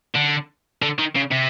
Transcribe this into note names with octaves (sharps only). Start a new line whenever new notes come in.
D3
D3
D#3
C#3
C3